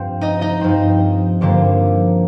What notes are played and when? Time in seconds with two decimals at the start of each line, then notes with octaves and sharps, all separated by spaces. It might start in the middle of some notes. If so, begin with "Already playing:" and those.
Already playing: G2 F3 C4
0.21 D#4 D#5
0.41 D#4 D#5
0.61 G2 F3 C4
1.41 G2 D3 F3 A#3